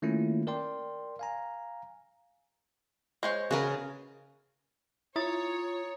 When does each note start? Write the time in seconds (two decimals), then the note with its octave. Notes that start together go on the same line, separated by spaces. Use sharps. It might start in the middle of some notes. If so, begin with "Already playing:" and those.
0.02 D#3 A3 A#3 C#4 E4 F4
0.47 A#4 D5 G5 C6
1.19 F5 G#5 A#5
3.23 G#3 C5 C#5
3.51 C#3 F#4 A#4 B4
5.16 E4 F4 C#5 A#5 D#6 A6